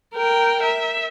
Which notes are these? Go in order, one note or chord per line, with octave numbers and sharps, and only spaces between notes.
A#4 G5
E5